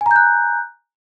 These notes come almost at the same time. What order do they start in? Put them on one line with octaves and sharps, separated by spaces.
G#5 A#5 G6 F#6